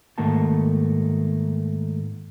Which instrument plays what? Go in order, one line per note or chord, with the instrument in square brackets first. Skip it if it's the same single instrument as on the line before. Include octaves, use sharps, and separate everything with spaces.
[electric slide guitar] G#2 D#3 A3 A#3 F#4 A5